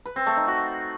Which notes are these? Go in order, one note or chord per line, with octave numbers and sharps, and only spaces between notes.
B4
C4
A3
D#4
F#4